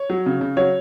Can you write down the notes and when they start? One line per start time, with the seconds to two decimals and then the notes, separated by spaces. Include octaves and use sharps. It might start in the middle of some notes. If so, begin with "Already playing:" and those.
Already playing: C#5
0.10 F#3
0.26 C#3
0.41 C#3
0.57 F#3 C#5